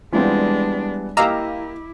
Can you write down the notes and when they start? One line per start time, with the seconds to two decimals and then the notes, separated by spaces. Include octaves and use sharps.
0.12 E3 G3 G#3 B3 C4 D4 F4
1.17 A#3 E4 G4 D#5 F5 A#5 D6 E6